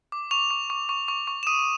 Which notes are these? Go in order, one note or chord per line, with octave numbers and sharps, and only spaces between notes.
D6
C#6 F7
C#6
C#6
C#6
C#6
C#6
E7
D#6 D#7